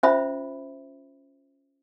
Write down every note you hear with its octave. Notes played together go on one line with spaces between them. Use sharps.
C#4 F4 C5 E5 B5